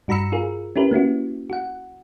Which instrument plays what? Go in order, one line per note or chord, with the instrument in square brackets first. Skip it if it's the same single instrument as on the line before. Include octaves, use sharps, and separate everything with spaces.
[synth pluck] G2 F#4 A#5 B5 E6 C#7
F4 G#4 A#4
C#4 E4 G4 A#4 B4
A#3 C#4 E4 F#4
F#4 F#5